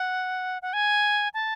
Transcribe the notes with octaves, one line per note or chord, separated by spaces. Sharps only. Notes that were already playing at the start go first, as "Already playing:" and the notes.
Already playing: F#5
F#5
G#5
A5